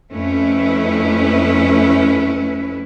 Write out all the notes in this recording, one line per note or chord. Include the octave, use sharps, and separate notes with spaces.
F2 A3 C#4 E4 B4